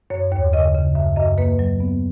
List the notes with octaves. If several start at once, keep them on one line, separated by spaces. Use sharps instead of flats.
F#2 C#5
D#2 C#5
C#3 D#5
C#3
F#2 E5
F#2 D#5
A#3 B4
F#3
B3